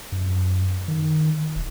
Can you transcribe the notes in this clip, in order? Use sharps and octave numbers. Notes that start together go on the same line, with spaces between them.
F#2
D#3
E1